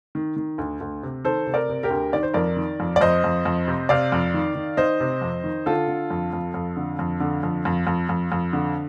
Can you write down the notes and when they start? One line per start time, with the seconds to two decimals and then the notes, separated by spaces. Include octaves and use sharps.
0.15 D#3
0.36 D#3
0.58 D2
0.81 D2
1.03 C3
1.24 D#3 A4 C5
1.47 C3
1.54 A#4 D5
1.69 C3
1.83 G4 A#4
1.90 D2
2.13 D#3 D5
2.23 C5
2.34 F2 A#4 D5
2.57 D#3
2.80 F2
2.96 D5
3.01 F2 C5 D#5
3.24 F2
3.45 F2
3.68 C3
3.89 C3 D5 F5
4.12 F2
4.34 D#3
4.55 D#3
4.77 D#3 C5 D#5
5.01 C3
5.22 F2
5.44 D#3
5.66 D3 F4 A4
5.88 D3
6.10 F2
6.33 F2
6.54 F2
6.77 D3
6.99 F2
7.20 D3
7.43 F2
7.65 F2
7.87 F2
8.09 F2
8.32 F2
8.53 D3